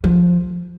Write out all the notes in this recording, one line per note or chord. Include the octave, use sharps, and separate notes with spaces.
F3